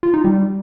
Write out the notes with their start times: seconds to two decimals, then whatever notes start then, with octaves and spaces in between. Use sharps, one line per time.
0.03 F4
0.14 D#4
0.24 G3